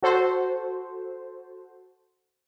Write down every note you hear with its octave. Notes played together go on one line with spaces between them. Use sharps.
F#4 A4 C5